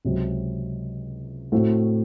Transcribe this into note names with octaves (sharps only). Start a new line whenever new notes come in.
C#2 C3 F#3 C4
A2 A3 C4 F#4